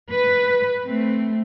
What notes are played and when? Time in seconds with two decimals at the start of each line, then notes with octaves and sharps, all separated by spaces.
0.12 B4
0.84 A3 C4